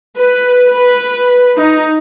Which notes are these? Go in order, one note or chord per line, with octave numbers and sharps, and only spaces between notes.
B4
B4
D#4